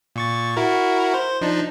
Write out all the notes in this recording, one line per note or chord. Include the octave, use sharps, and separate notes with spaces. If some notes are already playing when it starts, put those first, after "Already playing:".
A#2 C#6 A6
E4 F#4 A#4
C5
F3 D4 D#4